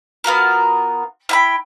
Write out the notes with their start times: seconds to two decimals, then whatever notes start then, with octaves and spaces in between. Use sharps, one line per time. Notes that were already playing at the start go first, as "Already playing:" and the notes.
0.24 B3 F4 F#4 A#4
1.29 E4 G5 B5